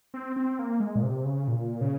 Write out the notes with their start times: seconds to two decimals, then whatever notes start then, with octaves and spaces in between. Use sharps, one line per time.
0.14 C4
0.36 C4
0.59 A#3
0.80 G#3
0.96 A#2
1.03 C3
1.25 C#3
1.48 A#2
1.81 C#3